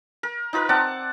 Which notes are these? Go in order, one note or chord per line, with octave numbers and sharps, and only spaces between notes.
A#4
D#4 F4 A#4 B4
C4 D5 F#5 A5